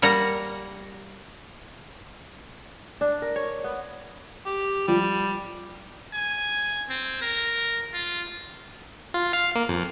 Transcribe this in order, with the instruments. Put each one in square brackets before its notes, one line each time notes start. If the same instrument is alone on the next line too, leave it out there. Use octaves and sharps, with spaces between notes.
[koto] G3 A#3 F#5 A#5
[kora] D4
A#4
C#5
B3
[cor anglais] G4
[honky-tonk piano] F3 [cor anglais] G3
[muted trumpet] G#5
C4
A#4
F4
[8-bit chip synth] F4
F5
A#3
F2